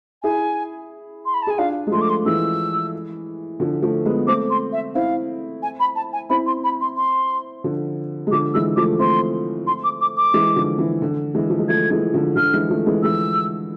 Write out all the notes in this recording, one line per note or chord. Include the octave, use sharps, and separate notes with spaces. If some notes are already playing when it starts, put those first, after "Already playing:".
E4 G#4 G#5
C6
B5
A5
G#4 G#5
D4 F4 F5
G#3
F3 A3 C6
D6
C6
E3 G#3 E6
D3 F3
F3 A3
G#3 B3
A3 C4 D6
C6
E5
C4 E4 F5
G#5
B5
A5
G#5
C4 E4 B5
C6
B5
C6
C6
D3 F3
G#3
D3 F3 D6
E3 G#3 E6
F3 A3 D6
A3 C4 C6
C6
D6
D6
D6
E3 G#3
D3 F3
E3
D3
E3 G#3
F3
G#3
F3 A3 G#6
E3 G#3
D3 F3
D3 F3 F6
E3 G#3
F3 A3
E3 G#3
E3 G#3 E6